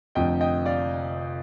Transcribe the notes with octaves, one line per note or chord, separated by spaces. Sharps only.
F1 F2 D3 F3 D#5 G5
D#5 G5
D5 F5